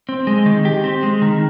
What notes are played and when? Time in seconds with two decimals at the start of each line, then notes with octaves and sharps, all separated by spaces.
0.09 C4
0.27 G#3
0.46 D#3
0.65 G4
0.84 C4
1.03 G#3
1.22 D#3